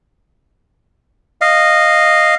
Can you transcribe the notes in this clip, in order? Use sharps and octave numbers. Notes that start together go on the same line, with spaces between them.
D#5 F5